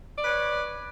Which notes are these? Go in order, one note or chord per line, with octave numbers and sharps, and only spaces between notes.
B4 C#5 D5